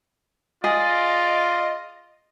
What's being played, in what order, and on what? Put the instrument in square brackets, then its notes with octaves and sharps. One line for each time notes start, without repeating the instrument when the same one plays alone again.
[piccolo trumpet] F4 [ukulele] G#4 [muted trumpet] D5 [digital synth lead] D#5